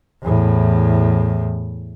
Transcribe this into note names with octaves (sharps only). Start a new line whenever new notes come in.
E2 A2